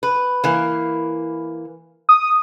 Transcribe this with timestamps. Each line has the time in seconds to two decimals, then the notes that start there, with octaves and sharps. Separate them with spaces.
0.03 B4
0.44 E3 A#3
2.09 D#6